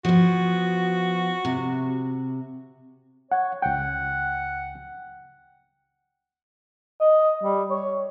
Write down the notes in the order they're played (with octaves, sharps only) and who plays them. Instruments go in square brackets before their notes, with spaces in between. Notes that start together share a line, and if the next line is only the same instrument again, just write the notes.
[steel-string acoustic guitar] F3 B3 [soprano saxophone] F#4
[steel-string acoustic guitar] C3
[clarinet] C#5 [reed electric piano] F#5
[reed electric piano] C#2 G5 [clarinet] F#5
[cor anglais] D#5
G3
C#5